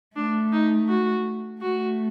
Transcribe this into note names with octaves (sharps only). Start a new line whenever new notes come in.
A3 D4
D#4
F#4
A3 F#4